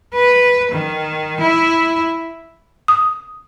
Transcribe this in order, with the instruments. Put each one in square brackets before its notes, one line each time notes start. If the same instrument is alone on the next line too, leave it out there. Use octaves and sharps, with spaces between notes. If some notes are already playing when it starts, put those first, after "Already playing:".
[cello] B4
D#3
E4
[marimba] D#6